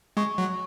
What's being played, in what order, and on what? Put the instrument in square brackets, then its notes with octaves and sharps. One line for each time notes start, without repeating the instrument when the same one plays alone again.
[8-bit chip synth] G#3 [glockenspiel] C#6
[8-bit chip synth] F#3